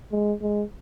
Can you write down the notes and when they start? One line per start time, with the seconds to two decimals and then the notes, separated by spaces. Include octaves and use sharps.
0.12 G#3
0.42 G#3